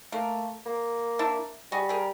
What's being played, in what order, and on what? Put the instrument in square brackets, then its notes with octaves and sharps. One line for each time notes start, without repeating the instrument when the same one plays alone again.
[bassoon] A3 [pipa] A#3
[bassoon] A#3
[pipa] D4 E4
[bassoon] G3 [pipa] F#4 G#4
[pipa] G#4 A#4